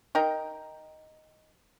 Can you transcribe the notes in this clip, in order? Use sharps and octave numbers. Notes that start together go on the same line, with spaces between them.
D#4 A#4 G5